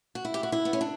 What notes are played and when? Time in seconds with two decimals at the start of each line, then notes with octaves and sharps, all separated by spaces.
0.15 F#4
0.25 E4
0.34 G4
0.43 F#4
0.52 E4
0.65 B3
0.73 C#4
0.81 D4